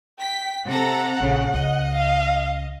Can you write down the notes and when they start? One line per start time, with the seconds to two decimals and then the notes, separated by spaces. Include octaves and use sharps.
0.19 G5 B6
0.68 C3 A4 F#5 A#5
1.20 A#1 C#3
1.54 C#2 D#5
1.93 F5